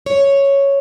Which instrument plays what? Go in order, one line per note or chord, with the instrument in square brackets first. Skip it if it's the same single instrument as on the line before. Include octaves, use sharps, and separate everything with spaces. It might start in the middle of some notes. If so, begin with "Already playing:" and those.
[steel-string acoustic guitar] C#5